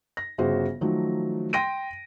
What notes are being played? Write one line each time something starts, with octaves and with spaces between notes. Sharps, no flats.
A#6
G1 C#3 F#4 C5
D#3 F3 F#3 A3
G5 C6 A#6 D7 D#7